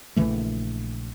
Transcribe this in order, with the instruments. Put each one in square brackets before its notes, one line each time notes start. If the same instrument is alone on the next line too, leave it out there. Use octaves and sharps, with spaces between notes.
[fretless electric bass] A#1 C#3 E3 A3